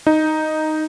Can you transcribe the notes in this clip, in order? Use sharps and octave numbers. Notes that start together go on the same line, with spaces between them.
D#4